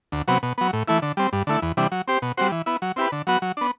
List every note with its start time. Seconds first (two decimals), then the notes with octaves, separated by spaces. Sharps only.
0.12 D2
0.28 C3 F#3 B3
0.43 B2
0.58 F#3 B3
0.73 A2
0.88 E3 A3 E4
1.02 D3
1.17 G3 C4
1.33 G2
1.47 D3 A3 E4
1.62 E2
1.77 C3 E3 G3 D4
1.92 F#3
2.08 C4 G4 C5
2.22 B2
2.37 G3 C4 F#4 C5
2.52 E3
2.66 B3 E4
2.82 F#3
2.96 C4 E4 G4 B4
3.12 D3
3.27 F#3 B3 F#4
3.42 F#3
3.57 B3 D4